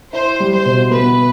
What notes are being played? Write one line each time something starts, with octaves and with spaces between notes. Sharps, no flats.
E4 C5
G3
C5
B2
B3 B4